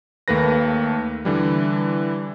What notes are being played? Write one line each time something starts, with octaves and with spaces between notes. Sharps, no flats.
D#2 A3 A#3 B4 A#6
D3 E3 G3